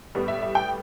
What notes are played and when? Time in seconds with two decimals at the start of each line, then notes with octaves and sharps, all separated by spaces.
0.15 A2 G3 B3
0.28 E5
0.42 E5
0.55 G5